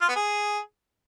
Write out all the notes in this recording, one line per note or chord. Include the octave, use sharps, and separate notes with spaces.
F4
B3
G#4